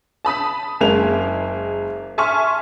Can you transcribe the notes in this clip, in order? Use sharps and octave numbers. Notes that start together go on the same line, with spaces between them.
A5 B5 D#6 B6
F#1 G#3 A#3 F7
E5 G#5 A5 C6 C#6 F6